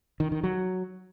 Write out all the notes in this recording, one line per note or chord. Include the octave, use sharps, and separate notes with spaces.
D#3
D#3
F#3